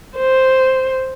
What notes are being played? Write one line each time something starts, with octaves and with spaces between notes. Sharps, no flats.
C5